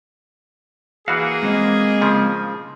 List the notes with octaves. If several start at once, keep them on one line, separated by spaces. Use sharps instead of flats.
E3 A#3 F#4 G#4 F5 F#5
G#3 C4 D#5
C#3 F3